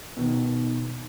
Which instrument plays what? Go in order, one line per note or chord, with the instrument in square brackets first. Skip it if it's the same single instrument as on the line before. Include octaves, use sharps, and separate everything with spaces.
[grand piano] B2 D#3